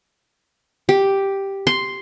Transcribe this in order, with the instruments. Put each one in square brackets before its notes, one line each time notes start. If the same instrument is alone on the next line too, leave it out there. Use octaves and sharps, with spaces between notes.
[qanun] G4
C6